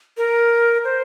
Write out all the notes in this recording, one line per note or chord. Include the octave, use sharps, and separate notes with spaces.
A#4
C5